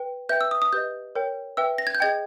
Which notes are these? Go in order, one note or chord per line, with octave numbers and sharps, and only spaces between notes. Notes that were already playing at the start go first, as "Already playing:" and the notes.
Already playing: B4 G5
B4 E5 G5 G6
E6
D#6
D#6
G4 B4 D#5 G6
A#4 C#5 G5
B4 E5 G5 E6
A#6
G#6
G6
G#4 D#5 G5 G#6